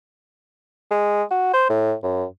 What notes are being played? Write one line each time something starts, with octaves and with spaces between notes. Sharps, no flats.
G#3
F#4
C5
A2
F#2